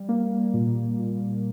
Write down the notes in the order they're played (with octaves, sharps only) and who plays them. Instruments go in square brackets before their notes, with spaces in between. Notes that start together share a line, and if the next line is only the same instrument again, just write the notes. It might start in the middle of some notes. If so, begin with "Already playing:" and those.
Already playing: [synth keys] G3
A#3
A#2
A#2